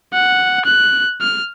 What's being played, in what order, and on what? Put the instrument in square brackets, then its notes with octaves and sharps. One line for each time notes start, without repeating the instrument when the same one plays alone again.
[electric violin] F#5
F#6
F6